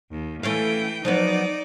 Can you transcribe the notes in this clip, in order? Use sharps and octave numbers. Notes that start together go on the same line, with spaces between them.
D#2
E3 A3 C#4 F5 G5
F3 F#3 B3 D#4 D5